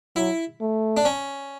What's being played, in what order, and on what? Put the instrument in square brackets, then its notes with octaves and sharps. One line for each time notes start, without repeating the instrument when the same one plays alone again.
[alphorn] F#3 [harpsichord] E4
[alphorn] A3
[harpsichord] D4
C#4